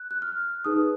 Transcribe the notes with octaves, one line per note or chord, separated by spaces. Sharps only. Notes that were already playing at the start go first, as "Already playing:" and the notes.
Already playing: F#6
F#6
F6
D#4 G#4 B4 D#6